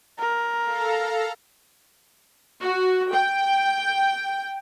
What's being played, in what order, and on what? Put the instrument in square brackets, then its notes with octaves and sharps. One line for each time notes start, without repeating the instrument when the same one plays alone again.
[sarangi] A#4
[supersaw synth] A4 F5 A#5
[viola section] F#4
G5